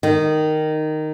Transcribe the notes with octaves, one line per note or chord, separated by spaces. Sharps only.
D#3